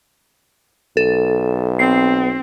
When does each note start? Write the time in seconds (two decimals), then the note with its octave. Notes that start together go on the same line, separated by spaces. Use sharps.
0.97 B1 A4
1.79 C4 C7